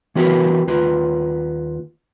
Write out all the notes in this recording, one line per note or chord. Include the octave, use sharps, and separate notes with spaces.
E3 B3 F#4 G4 A#4 B4
D#2 F4 B4